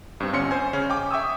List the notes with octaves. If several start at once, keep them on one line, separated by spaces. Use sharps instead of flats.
G2 C4
G1 C#4 C6 C#7
C5 G#5
C#3 C#4
G5 G#5 D6
E5 G5 C#6 D#6 E6